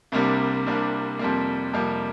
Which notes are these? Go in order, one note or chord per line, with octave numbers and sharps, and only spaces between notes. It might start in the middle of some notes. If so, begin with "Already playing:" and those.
C2 C3 G3 A#3 D4
C2 C3 G3 A#3 D4
F2 C3 G3 A#3
F2 C3 G3 A#3